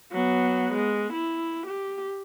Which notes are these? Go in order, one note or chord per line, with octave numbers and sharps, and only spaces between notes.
F#3 B3
G#3
E4
G4